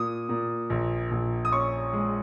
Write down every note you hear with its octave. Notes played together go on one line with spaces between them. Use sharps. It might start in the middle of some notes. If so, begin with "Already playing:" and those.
Already playing: A#2 D#6
A#2
A#1
A#1
D#6
C#4 C#6
G#3